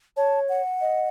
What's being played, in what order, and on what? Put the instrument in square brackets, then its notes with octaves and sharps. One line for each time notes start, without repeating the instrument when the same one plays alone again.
[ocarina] C#5 [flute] A5
[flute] F#5
[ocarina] D#5